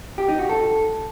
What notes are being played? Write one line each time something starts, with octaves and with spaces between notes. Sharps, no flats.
G4
D#4
F#4
A4